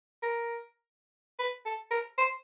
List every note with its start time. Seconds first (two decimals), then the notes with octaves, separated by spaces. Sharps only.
0.22 A#4
1.39 B4
1.66 A4
1.91 A#4
2.18 C5